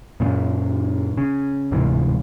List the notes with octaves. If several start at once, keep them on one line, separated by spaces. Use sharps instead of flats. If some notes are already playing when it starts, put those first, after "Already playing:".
F#2 A#2 C#3
C#3
D1 G#2 C3 E3